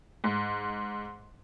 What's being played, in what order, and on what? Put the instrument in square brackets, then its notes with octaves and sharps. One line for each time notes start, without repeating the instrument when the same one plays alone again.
[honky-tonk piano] G#2